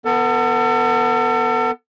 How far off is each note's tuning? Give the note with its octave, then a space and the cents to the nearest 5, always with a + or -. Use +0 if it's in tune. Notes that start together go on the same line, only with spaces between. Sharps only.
B3 +0 A4 +35